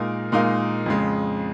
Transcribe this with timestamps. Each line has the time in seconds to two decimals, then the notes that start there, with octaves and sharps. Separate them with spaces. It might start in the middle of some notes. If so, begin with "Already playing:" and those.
Already playing: A#2 G#3 D#4 A#4 F5
0.32 A#2 G#3 D#4 A#4 F5
0.86 F2 C#3 G#3